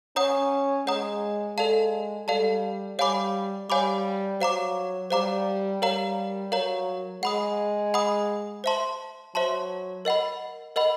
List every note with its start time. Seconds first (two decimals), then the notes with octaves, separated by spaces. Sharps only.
0.16 C#4 C#5 F#5 A#5 D#6
0.87 G#3 C#5 F#5 A#5 D#6
1.57 G#3 A4 D5 F5 A5
2.28 G3 A4 D5 F5 A5
2.98 G3 C#5 F5 G#5 B5 D6
3.70 G3 C#5 F5 G#5 B5 D6
4.40 F#3 C5 F5 A#5 D6
5.10 G3 C5 F5 A#5 D6
5.81 G3 A#4 C#5 F5 A#5
6.52 F#3 A#4 C#5 F5 A#5
7.23 G#3 F#5 B5 D#6
7.94 F#5 B5 D#6
8.64 C5 E5 A5 C6
9.35 F#3 C5 E5 A5 C6
10.05 A#4 D#5 F#5 B5
10.76 A#4 D#5 F#5 B5